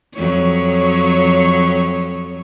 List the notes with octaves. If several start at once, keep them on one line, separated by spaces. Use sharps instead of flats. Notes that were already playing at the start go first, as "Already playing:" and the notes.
F2 F#3 C#5